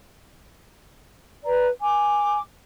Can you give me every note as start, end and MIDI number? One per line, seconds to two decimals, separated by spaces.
1.45 1.67 71
1.45 1.67 74
1.45 1.67 82
1.81 2.39 80
1.81 2.39 86